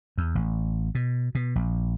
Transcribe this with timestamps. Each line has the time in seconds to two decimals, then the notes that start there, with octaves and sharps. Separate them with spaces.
0.18 E2
0.35 A1
0.95 B2
1.35 B2
1.56 A#1